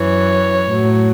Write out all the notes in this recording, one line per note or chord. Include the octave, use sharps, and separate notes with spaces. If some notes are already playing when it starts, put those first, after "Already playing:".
Already playing: F#2 E3 C#5
A2 F#3